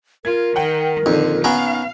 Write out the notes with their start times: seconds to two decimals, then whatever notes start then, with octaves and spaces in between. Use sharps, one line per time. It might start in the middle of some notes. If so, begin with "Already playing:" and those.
0.25 F4 A#4 G#6
0.56 D#3 F#5 G5
1.06 F2 A#2 D3 D#3
1.44 B3 C#4 A#4 F5